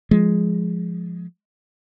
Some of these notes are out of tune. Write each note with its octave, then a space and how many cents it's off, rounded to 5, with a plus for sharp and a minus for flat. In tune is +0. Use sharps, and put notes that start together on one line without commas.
F3 +0 G#3 +0